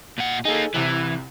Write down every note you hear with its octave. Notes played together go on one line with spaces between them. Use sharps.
A#2 F#5
A#3 D#4 G#4 A4
C2 C3 E3 F#7